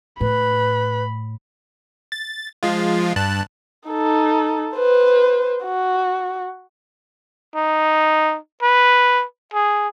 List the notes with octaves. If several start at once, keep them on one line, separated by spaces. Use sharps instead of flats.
A2 B4 B5
A6
F3 G#3 F4
G2 A5 F#6
D#4 A4
B4 C5
F#4
D#4
B4
G#4